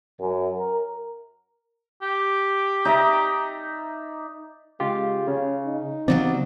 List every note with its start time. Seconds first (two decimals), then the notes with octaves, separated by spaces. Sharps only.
0.20 F#2
0.58 A#4
2.02 G4
2.85 D#4 D5 E5 A#5
4.80 C#3 G#3 F4 G4
5.28 C#3 C#4
5.66 D#4
6.08 C#3 F#3 G3 B3 C4 D5